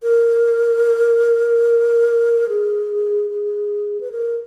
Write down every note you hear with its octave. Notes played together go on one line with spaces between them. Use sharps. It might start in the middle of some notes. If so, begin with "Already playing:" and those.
A#4
G#4
G#4
B4
A#4